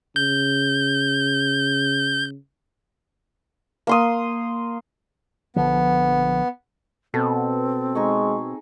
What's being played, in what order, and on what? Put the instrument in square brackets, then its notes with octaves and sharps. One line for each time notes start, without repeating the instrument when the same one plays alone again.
[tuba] C#3 [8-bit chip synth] G6
[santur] A#3 C6 D#6
[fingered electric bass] A#1 D3 F3 [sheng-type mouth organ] B3
[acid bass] B2 [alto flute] C4 [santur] A4
[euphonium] G#3 [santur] D#4 G#4 C#6